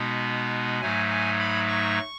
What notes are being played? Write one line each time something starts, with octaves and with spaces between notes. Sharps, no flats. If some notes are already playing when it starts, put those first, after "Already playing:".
Already playing: B2 G#3 B3 D#4
G#2 F#3 A3 D#4 G#5
G#5
B5
C#6